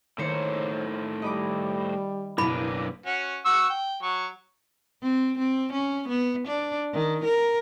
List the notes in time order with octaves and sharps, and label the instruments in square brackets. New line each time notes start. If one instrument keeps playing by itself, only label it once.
[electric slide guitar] A2 C5 [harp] D#3 A#3 C#5
[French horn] G3 [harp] D#5 B5 D6
[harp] F#1 B2 [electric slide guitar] A#3 D4 B4 [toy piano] E4 B5
[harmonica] C#4 F#4
F#4 C#6 E6
G5
F#3 C#6
[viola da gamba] C4
C4
C#4
B3
D4
D#3
A#4